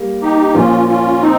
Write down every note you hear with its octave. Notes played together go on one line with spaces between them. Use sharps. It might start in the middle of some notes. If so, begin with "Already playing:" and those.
Already playing: G3 A#3
D#4 G4
A#2 F3 A#3 C#4 F4
C#4 F4
C4 D#4